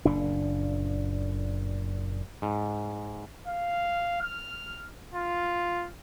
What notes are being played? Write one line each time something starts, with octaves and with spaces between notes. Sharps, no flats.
F#1 A#2 D4
G#2
F5
F6
F4